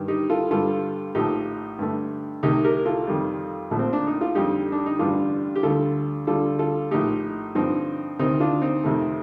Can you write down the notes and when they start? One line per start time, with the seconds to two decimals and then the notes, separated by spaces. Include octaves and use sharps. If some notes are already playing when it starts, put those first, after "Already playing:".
Already playing: G2 D#3 G3
0.08 D#4 G4
0.30 F4 A4
0.51 G2 D3 G3 F4 A4
1.15 A#1 A2 F3 A3 D#4 G4
1.79 G2 D3 A3
2.43 C2 C3 D#3 A3 D#4 G4
2.64 G4 A#4
2.86 F4 A4
3.07 F2 D#3 G3
3.71 A#1 A#2 F3 A3
3.79 C4
3.93 D4
4.07 D#4
4.21 F4
4.35 F2 D3 G3 D#4 G4
4.72 D4
4.86 D#4
4.99 A1 G2 D3 G3 D4 F4
5.55 G4
5.63 D2 D3 G3 F4 A4
6.27 D2 D3 G3 F4 A4
6.59 F4 A4
6.91 A#1 A2 A3 D#4 G4
7.55 G2 D3 F3 C4 D#4
8.19 D2 C3 D#3 C4 D#4
8.40 D4 F4
8.62 C4 D#4
8.83 F2 C3 D#3 A3